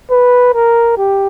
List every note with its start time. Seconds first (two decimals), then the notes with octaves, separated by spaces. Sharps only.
0.11 B4
0.54 A#4
0.98 G4